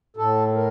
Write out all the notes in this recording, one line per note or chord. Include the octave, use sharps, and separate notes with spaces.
A2 A4
A#4